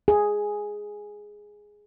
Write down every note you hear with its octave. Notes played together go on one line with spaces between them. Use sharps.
G#4